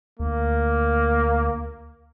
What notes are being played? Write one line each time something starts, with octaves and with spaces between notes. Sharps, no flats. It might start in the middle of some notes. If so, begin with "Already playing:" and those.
D2 A#3